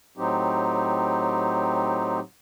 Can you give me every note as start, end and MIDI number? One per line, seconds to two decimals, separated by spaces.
0.17 2.20 45
0.17 2.20 54
0.17 2.20 60
0.17 2.20 63
0.17 2.20 67